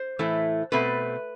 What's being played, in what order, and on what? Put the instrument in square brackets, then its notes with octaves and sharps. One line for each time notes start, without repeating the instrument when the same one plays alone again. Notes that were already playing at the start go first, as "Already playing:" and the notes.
Already playing: [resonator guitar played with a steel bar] C5
A2 E3 A3 E4
B2 A3 C4 B4